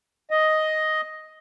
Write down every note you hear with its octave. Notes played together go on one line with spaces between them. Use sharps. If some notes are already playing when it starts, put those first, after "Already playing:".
D#5